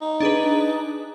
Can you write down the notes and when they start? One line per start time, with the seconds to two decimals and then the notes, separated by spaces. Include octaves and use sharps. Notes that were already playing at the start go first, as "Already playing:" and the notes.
0.02 D#4
0.20 D4 G#4 B4